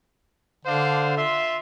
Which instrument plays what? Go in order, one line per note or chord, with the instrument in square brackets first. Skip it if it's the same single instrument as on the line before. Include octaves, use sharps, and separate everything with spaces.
[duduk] D3 [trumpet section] D4 C5 F5
[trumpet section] F4 E5 C6